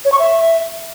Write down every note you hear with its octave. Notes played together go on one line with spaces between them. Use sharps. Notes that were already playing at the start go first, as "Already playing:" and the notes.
C#5
C#6
E5